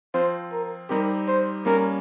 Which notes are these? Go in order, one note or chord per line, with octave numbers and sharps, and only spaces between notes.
F3 C4 F4 C5
A#4
G3 C4 D#4 G4 A#4
C5
G3 A#3 C#4 A#4